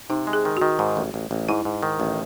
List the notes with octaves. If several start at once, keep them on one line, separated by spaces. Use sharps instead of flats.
C3 D#4
G#3
G#4
D#3
D#3 F#4
G#2
A1
A1
A1
G#2 E4
G#2
D#3
A1